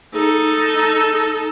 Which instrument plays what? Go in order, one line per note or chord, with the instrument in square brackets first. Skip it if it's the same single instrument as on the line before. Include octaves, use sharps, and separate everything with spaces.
[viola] D#4 A4